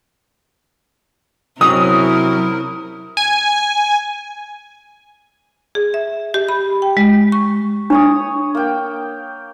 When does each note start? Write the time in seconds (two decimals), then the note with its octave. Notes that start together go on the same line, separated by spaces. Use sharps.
1.61 C3 F#3 C4 C#4 E4 A#4 D#6
3.17 G#5
5.75 G#4
5.94 E5
6.34 G4
6.49 B5
6.82 G5
6.97 G#3
7.32 C#6
7.90 D4 C#5 C#6 D#6
8.55 A#3 G5